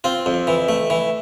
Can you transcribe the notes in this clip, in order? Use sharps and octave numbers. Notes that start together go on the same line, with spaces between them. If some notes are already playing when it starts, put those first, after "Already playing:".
C4 F4
F2
E3
A3
E3